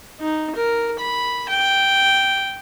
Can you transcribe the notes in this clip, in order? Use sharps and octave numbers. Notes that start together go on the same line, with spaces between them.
D#4
A#4
B5
G5